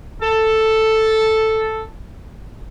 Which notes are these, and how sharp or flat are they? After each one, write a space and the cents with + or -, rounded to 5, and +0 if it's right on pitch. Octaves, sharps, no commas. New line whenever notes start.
A4 +0